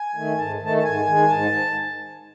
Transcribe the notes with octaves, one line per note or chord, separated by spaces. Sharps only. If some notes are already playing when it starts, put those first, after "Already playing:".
Already playing: G#5
D#3 A3
G#2 A5
D#3 A3 A5
A5
G#2 G#5
D#3 G#3
G#2 A5